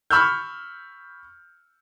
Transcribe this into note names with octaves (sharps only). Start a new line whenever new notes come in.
B5 C#6 E6 F6 G6